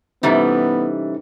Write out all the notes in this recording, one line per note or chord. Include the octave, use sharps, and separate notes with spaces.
C3 E3 G3 B3 C#4 D#4 A4